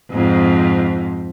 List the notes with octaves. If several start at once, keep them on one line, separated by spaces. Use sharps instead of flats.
F2 G#2